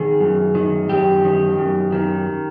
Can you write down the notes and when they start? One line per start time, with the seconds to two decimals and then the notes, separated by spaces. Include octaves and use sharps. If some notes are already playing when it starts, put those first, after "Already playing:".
Already playing: D#3 G#4
0.20 F#2
0.55 D#3
0.89 F#2 G4
1.24 D#3
1.58 F#2
1.92 D#3